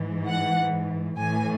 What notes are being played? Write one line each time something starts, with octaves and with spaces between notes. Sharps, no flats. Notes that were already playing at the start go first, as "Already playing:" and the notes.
Already playing: G#2 E3
F#5
A2 E3 G#5